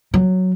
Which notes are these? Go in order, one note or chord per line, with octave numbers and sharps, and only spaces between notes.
F#3